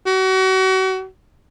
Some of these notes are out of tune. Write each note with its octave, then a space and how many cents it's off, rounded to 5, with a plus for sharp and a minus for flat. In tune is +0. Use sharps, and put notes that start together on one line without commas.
F#4 +35